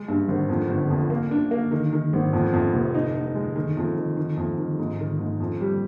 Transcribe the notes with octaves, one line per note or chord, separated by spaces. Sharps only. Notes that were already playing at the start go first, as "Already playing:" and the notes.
Already playing: G#3
G2
G#1
F2
G1
F2
A#3
D4
A#3
D#3
D#3
G#1
F2
F2
F1
D#4
D#4
G#3
D#3
F2
D#3
D#3
F2
D#3
G#2
D#3
G#2
F2
G3